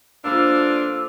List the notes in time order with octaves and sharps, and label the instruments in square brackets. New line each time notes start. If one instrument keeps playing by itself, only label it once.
[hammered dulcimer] D3 A#3 C5 [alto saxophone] D4 [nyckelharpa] F4 F5 [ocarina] E6